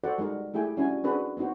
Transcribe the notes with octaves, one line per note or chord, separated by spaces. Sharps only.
F#4 A4 C5 D5 F#5
G3 G#3 D#4 A#4 F#5
A3 E4 G4 G#4 G5 G#5
G3 C#4 D4 E4 F#4 G#5
C4 D4 F#4 G#4 B4 C5
B3 C4 D#4 F#4 C5